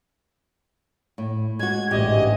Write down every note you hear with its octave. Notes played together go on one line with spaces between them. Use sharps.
A2
G#3 F#4 G#6
A1 D2 G#2 G4 D#5